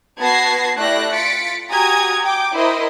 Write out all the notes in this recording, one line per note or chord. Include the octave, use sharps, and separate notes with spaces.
B3 F#4 A5 G#6 A#6 C7
A3 E4 G4 D5 F#6 A#6
F4 A6 B6 C#7 D7
F#4 G4 G#5 A#5 D#6 G#6
G5 D6
E4 A#4 C5 D#5